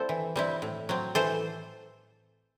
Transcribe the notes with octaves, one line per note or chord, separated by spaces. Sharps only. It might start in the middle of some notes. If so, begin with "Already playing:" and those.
Already playing: G3 C4 E4 A4 C5
E3
G3 C4 E4
A2
F#3 C4
E3 A4 C5